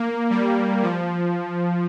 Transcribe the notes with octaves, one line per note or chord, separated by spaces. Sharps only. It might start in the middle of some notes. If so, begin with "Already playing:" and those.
Already playing: A#3
G3
F3